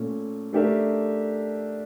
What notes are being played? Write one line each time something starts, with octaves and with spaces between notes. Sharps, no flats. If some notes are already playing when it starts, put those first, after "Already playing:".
Already playing: A#2 A3 C#4
A3 D4 G4 A#4 E5